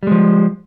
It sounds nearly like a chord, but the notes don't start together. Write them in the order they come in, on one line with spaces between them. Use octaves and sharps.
G3 G#3 F3